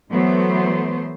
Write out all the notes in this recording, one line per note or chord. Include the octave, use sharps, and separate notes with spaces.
E3 F#3 A3 B3 C5